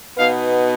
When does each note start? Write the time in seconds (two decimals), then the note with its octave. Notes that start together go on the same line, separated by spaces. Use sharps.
0.16 B2 B3 D#4 F5